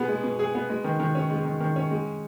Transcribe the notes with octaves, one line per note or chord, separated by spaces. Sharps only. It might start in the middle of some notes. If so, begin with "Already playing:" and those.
Already playing: B2 B3 G#4
G#3
B2
G#4
B3
G#3
D#3
D#3
C#4
G#3
D#3
D#3
C#4
G#3